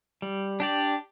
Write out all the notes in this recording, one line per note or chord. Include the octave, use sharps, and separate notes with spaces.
G3
D4 G4 D5